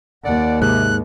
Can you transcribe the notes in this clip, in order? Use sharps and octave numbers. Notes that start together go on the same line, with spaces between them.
D#2 D5 F#5
G#2 C3 F#6